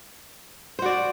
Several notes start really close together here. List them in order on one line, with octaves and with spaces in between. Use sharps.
C5 F#4 D5